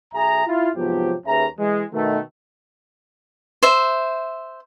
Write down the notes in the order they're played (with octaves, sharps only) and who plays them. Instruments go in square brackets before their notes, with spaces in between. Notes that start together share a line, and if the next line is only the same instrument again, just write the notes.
[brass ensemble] B1 G#4 E5 A#5
E4 F4
G#2 C3 F3 F#3 B3 G4
D#2 C#4 G#4 B4 E5 A#5
E3 G#3
B2 D#3 A3
[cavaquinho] C5 E5